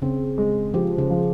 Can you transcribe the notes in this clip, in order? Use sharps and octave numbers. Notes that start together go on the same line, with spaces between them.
C#3 C4
G#3
F3 G4
C#3
F3